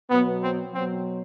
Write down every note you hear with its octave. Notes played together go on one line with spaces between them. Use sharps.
B2 F#3 B3
C4
B2 F#3 C4